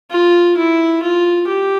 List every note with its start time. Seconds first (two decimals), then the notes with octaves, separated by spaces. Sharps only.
0.11 F4
0.57 E4
1.03 F4
1.47 G4